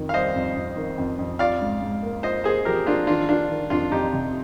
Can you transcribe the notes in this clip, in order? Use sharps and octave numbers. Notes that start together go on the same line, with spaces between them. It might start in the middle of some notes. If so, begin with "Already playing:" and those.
Already playing: F2 D#3
F5
G3 C5 D#5
F2
F2
D#3
F2
F2
F4 D5 F5
G#2
G#2
A#3
F4 C5 D#5
A#3 G#4 C5
F3 G4 A#4
A#3 D4 F4
D#3 D4 F4
D#3 D4 F4
D#3
F2 D4 F4
F2 D#4 G4
C3